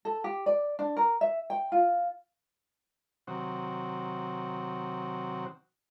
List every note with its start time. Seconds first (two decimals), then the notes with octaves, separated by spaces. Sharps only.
0.05 A4
0.24 G4
0.46 D5
0.79 D4
0.97 A#4
1.21 E5
1.50 G5
1.72 F4
3.27 C3 D#3 F#3 C4 F#4